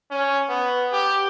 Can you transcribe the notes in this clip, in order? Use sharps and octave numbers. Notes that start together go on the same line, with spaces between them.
C#4
B3
G4